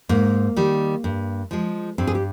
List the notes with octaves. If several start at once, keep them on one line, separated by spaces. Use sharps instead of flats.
G#2 A#3
D#3 G3
G2
F3 G#3
G2 C4
G#4
G4